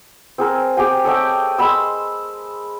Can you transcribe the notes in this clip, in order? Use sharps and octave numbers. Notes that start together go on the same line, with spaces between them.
C4 G#4 A#4
G4 G#4 G5 G#5
A4 C#5 D#5 G5
G#3 B5 C6 E6